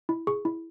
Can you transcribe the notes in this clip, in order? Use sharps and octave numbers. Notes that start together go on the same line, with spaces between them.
E4
G#4 C#6
E4